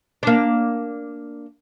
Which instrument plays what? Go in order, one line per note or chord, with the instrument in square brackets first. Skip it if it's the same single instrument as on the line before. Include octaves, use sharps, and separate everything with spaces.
[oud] A#3 D4